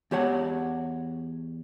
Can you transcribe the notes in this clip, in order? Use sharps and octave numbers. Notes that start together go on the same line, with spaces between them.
E2 G4 C#5 F#5